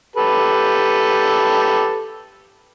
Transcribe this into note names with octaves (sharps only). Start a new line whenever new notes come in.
G4 A4 B4